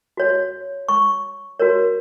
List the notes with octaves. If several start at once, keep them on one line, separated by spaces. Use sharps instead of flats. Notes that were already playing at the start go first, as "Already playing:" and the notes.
F#4 C#5
C#6
F#4 A#4 C#5